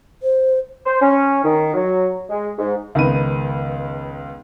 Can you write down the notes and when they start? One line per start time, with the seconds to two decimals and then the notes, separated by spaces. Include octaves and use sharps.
0.23 C5
0.85 C5
1.01 C#4
1.43 D#3
1.74 F#3
2.30 G#3
2.58 G#2
2.95 C#2 D#3 B3 D#7